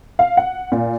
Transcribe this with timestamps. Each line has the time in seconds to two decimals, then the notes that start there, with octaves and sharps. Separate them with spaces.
0.19 F5
0.37 F#5
0.72 A#2